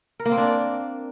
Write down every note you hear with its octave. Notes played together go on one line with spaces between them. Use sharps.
A#4
A#3
C4
D4
D5